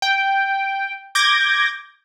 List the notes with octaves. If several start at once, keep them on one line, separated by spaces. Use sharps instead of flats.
G5
D6 G6 G#6 A#6